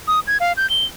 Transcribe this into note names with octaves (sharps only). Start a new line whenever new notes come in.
D#6
G#6
F5
G6
G7